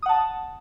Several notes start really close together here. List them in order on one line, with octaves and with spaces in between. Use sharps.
D#6 F#5 A5